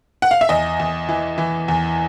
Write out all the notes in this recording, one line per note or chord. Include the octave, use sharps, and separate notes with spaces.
F#5
F5
E5
E2 D#5
E2
E3
E3
E2